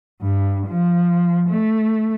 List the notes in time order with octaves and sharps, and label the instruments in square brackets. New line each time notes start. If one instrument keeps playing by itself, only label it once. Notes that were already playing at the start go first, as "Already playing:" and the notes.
[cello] G2
F3
A3